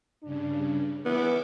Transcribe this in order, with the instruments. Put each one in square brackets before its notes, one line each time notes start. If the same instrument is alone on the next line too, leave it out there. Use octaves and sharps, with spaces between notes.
[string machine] G2 C#3 [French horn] D4
[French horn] E3 [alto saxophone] B3 [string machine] E5 D6